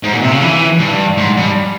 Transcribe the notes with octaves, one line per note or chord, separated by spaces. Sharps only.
G#2
A#2
C3
C#3
E3
G2
G#2
G2